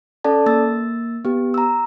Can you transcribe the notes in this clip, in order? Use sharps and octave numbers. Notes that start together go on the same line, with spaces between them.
C#4 A4 D5 A5
A#3 E6 A6
B3 G4
A#5 E6